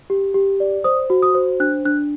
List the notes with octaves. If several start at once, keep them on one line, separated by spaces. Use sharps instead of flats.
G4
G4
D5
C5 D#6
F#4
D#6
C5
D4 F#6
D4 F#6